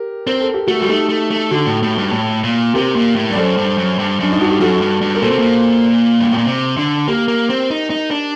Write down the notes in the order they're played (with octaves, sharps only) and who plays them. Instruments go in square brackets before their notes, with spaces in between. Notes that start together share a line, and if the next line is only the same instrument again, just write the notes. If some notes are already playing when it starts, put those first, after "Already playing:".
Already playing: [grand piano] G4 A#4
[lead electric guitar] C4 [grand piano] A#4
[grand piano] A4
G4
[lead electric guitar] A3 [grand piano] F#4 A4
[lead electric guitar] G3 [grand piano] F#4
[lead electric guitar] A3 [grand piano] D#4 G4
[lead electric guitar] A3
A3
[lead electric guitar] D3 [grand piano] F#4 A4
[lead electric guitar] A2
A2
G2
A2
A#2
[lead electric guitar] C3 [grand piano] G4 A#4
[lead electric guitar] A#2
A2
[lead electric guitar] G2 [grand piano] D5
[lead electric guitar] F#2 [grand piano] A4 C5
[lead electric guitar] G2
F#2
G2
[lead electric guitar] F#2 [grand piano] D4
[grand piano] D#4
[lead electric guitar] G2 [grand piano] F#4
[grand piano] G4
[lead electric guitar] F#2 [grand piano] F#4 A4
[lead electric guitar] G2
G2
[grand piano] A#4
[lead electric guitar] A#2 [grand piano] A4 C5
[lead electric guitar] C3
A#2
G2
A2
A#2
C3
D3
[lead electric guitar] A#3 [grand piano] G4 A#4
[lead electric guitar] A#3
C4
D#4
D#4
D4